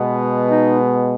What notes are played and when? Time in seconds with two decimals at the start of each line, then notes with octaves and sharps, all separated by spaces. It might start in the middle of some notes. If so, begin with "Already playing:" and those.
Already playing: B2 G#3 B3
0.48 D#4